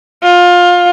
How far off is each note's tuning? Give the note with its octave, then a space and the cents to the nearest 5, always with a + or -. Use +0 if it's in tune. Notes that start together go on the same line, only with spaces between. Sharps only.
F4 +20